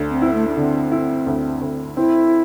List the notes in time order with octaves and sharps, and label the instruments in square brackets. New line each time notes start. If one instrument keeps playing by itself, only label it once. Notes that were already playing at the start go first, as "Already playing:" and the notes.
Already playing: [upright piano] D2
[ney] C4
[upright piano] E4
[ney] A3
D4
[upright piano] D3 [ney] C4
[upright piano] E4
D2
D2
[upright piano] C4 [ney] E4